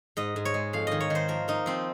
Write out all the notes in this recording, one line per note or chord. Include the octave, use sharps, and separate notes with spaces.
G#2 D#5
G#2
C#5
G#3
F2 F5
D#3 D#5
C#5
D#3 C5
F3 A#4
A#3 D#4
F3 C4